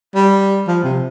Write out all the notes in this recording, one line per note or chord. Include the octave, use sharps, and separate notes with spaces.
G3
F3
C3